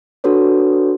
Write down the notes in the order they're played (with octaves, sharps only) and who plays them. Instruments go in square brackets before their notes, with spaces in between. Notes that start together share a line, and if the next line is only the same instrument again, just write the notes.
[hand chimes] D4 F#4 A4 B4 C#5